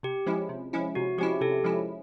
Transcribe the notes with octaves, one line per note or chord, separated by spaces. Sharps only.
C3 G4
F3 G#3 C#4 E4
C3
F3 G#3 C#4 E4
C3 F#4
F3 G#3 C#4 E4 G4
C3 G4 A4
F3 G#3 C#4 E4